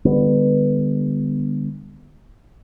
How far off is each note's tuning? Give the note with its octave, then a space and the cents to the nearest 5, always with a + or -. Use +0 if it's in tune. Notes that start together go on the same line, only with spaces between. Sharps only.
D3 +20 G3 +40 B3 +0